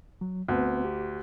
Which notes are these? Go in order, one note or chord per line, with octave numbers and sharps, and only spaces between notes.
F#3
D2 B3 C4 B4
G4